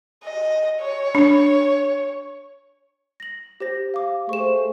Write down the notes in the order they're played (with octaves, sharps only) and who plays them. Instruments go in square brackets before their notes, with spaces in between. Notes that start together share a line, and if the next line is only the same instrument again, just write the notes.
[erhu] D#5
C#5
[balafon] D4
[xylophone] A#6 F#7
G4 C5 A#6
F5 D6
[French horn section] A3 G#4 C5 [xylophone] C#6 E7